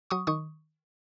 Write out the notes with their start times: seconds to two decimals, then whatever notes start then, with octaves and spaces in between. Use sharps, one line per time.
0.10 F#3 C#6 D#6
0.27 D#3 C#6 D#6